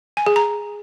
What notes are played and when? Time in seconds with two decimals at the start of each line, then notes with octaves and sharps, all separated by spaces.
0.17 G#5
0.26 G#4
0.36 A#5